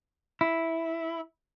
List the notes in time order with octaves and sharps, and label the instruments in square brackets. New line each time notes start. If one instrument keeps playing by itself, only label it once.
[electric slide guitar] E4